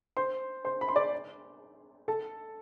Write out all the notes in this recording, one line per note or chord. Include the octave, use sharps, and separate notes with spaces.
C5 C6
C5 C6
B5
C6
D5 D6
A4 A5